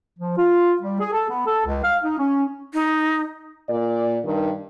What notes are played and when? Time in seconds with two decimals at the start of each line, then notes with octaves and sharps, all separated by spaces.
0.19 F3
0.37 F4
0.82 G3
1.00 G#4
1.13 A4
1.29 B3
1.46 A4
1.66 C#2
1.83 F5
2.03 D#4
2.18 C#4
2.73 D#4
3.69 A#2 D5
4.25 G2 D#3